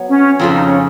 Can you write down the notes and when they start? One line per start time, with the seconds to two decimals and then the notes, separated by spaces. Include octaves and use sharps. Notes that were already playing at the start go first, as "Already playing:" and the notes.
Already playing: F#3 B3
0.09 C#4
0.39 F2 C#3 F3 F4
0.51 D#4
0.64 C#4